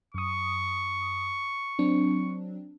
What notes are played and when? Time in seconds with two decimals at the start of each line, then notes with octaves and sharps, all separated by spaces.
0.14 F#2 C#6 D#6
1.79 F#3 C4 D4